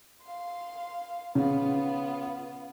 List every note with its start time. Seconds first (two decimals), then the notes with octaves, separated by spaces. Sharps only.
0.23 F5 C6
1.35 C#3 B3 F4